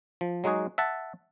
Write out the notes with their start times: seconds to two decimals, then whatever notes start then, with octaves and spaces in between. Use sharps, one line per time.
0.21 F3
0.44 F#3 G#3 D#4 F#4 G#4
0.78 E5 F#5 A5